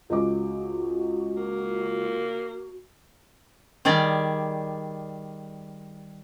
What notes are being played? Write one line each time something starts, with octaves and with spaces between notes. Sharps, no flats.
C#2 F#4 D#5 D6
A#3
D#3 G3 G#4 D5